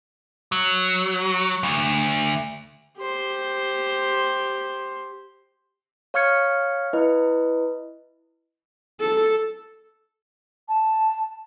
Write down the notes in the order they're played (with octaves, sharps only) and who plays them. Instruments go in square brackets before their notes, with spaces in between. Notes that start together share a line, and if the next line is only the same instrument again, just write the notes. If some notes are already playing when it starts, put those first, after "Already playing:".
[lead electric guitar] F#3
D2
[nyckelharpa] G4 C5
[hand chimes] C#5 F5 C#6 F6 G#6 C#7
E4 B4 D#5
[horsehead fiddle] A4
[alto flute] A5